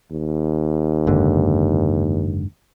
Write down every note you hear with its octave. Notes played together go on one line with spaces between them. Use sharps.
D#2
F#1 G#2 D3